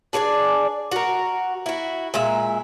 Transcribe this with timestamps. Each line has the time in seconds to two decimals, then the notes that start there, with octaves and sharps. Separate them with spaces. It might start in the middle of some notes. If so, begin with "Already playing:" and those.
0.13 D4 G#4 C#5 D5
0.92 F#4 A#4
1.66 E4 F#4
2.14 A#2 G#3 E5